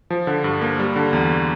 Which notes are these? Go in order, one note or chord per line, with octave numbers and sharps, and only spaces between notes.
F3
D3
G2
A#3
G3
D3
E2